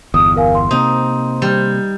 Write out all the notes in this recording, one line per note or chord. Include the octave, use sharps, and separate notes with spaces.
G1 E2 D#6
A#4 F5 G#5
C6
C3 A#3 C4 D#4
G3